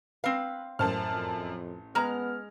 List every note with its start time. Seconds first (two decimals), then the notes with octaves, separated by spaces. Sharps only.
0.24 C4 B4 F5
0.79 A1 F#2 C5 A5 F6
1.13 F2
1.95 G#3 B3 A#5 F6